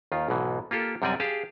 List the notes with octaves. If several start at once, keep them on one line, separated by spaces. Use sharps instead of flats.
D#2 D#3 F4
B1 G#2 B2 E3
A#3 F4 G4 A4
F#2 C3 G3 C4 D5 G#5
G4 G#4 F5 A5